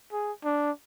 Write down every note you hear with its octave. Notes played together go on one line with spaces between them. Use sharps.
G#4
D4